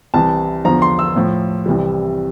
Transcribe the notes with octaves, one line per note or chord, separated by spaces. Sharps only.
C2 C3 E3 A5
E2 D3 F3 A#5
C6
E6
A2 F3
C2 C3 E3 G3